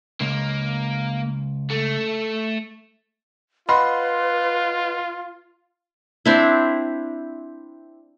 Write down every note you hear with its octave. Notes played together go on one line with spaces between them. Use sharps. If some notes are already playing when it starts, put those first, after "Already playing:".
C#2 A#3
A3
F4 B4 D#5 F#5 B5 C6
C4 D4 E4